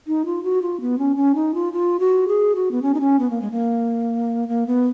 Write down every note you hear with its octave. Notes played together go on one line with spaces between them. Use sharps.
D#4
F4
F#4
F4
B3
C#4
C#4
D#4
F4
F4
F#4
G#4
F#4
B3
C#4
D#4
C#4
B3
A#3
G#3
A#3
A#3
B3